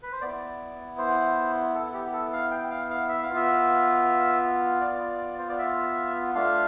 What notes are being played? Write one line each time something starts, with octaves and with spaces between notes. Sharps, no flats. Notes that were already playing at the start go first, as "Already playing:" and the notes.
B4
C5
B3 E4 D5
C5
A4
G4
A4
F5
G5
G5
F5
F5
E5
F5
B3 F4
E5
D5
C5
D5
E5
A3 D4 F4 F5